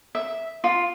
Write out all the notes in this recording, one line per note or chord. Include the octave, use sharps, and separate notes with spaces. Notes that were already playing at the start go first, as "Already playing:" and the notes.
E5
F4